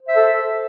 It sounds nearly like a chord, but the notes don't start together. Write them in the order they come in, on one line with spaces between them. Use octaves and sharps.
C5 E5 A4